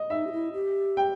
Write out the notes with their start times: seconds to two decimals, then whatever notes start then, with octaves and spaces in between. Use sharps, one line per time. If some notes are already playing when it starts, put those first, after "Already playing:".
Already playing: D#5
0.10 D#4 E5
0.27 G4
0.32 E4
0.53 G4
0.97 G5